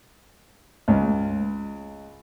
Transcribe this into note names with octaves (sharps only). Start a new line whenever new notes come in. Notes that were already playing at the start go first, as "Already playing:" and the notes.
C#2